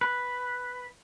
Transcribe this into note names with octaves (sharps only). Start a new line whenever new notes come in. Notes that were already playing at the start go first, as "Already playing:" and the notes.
B4